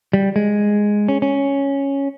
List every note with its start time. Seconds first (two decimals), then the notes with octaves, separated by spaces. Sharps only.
0.13 G3
0.36 G#3
1.08 C#4
1.22 C#4